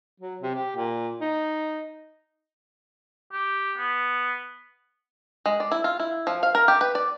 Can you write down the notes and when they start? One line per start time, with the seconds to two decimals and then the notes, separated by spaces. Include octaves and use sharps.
0.20 F#3
0.41 C3
0.55 G4
0.76 A#2
1.21 D#4
3.33 G4
3.77 B3
5.46 G#3
5.60 D5
5.72 E4
5.84 F4
6.00 E4
6.27 F3
6.43 F5
6.55 A#4
6.68 G4
6.81 B4
6.95 D5